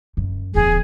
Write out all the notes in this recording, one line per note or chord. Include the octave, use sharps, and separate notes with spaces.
F#2
D1 E2 G#4